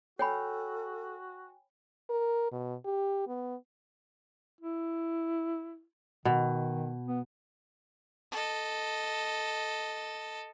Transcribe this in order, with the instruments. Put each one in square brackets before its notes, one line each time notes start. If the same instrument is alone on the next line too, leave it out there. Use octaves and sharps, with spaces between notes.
[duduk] F#4 [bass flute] A4 [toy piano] C#5 B5 [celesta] G5 G#5
[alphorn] A#4
B2
G4
B3
[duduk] E4
[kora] B2 [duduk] D#3
[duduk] B3
[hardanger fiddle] A4 D#5